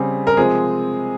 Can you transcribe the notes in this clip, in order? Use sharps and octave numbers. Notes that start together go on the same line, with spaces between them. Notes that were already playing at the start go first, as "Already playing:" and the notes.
Already playing: C#3 G3 C4 G#4
A#4
C3 F3 G#3 C4 G#4